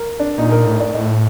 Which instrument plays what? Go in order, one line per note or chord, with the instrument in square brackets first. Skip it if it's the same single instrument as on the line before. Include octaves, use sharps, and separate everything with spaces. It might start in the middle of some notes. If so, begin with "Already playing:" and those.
Already playing: [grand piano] A#4
D4
[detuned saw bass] A#2 [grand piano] D#4
[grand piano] A#4
[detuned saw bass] A2
[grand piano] D5
[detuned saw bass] A2 [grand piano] D#5